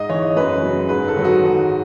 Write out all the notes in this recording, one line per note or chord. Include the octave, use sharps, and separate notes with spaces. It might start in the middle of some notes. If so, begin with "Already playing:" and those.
Already playing: G#2 D#5
E3 C#5
F#2 B4
C#3 F#3
G#2 B4
A4
D#3 F#3
F#4
G#2